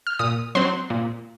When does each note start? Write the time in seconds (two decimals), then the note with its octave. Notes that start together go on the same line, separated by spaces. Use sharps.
0.07 F6
0.19 A#2 D#6
0.55 F#3 C4 C6
0.90 A#2